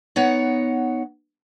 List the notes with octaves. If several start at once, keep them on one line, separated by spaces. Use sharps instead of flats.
B3 D#4 C#5 F#5